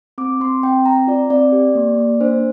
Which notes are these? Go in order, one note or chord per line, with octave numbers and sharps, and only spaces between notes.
C4 D6
C4 C6
C4 G5
C4 A#5
F4 D5
C4 D5
G4
A#3
A#3
D4 C5